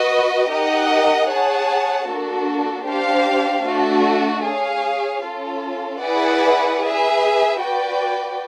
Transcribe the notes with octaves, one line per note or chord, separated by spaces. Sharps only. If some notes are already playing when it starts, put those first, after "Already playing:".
Already playing: F#4 B4 D#5
D#4 G4 A#4 D#5 F#5
G#4 C#5 F#5 A5
A#3 D4 F#4 A4
D4 G4 C5 F5
A3 D4 F#4
G#4 C#5 F5
C#4 F4 A4
E4 G#4 B4 D5 F#5
G#4 B4 E5
F#4 B4 D5 G5